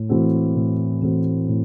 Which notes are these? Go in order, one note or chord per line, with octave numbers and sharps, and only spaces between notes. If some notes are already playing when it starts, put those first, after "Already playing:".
Already playing: A2
E3 A3 C4 F#4
A2
E3 A3 C4 F#4
A2